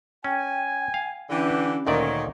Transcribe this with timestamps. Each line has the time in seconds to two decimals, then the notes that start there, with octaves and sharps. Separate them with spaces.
0.24 C#4 G5 G#5
0.94 F5
1.30 D3 E3 C#4 G4
1.87 D2 A#2 D#3 C#5 D5